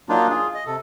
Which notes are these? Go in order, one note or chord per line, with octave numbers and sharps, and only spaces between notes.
F#3 A#3 D4 D#4 F4
F4 G#4
D#5
C3 A4